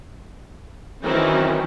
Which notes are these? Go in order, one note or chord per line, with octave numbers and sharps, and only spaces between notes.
D#3 E3 F#3 C4 C#4 E4